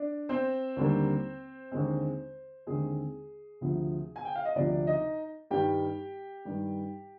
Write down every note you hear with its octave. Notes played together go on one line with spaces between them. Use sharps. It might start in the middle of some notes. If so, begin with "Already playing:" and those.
Already playing: D4 D5
C4 C5
D#2 D3 G3 A#3
D#2 D3 G#3 C4
D#2 D3 G#3 C4 G#4
D2 C3 F3
G#5
G5
F5
D#5
D2 C3 F3 D4 D5
D#4 D#5
G2 D#3 G3 G4 G5
G2 D#3 G3